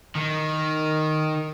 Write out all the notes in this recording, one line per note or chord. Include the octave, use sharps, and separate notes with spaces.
D#3